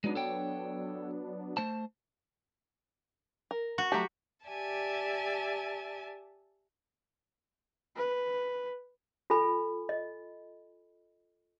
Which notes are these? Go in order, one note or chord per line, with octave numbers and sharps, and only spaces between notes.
F#3 G#3 B3 D4 D#4
A4 C#5 G5
A3 C5 A5
A#4
F#4
F#3 A3 G4 A5 A#5
G4 D5 E5 G#5 A5
B4
F4 A4 G#5 B5
D#5